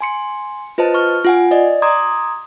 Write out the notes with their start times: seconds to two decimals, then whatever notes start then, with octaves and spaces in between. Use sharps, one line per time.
0.01 G#5 C6 C#7
0.78 F4 B4 C5 D#5 A5
0.94 C#6 F6
1.25 F4 F#5 G#5
1.51 D5 D#5
1.82 A#5 C6 D6 D#6 G#6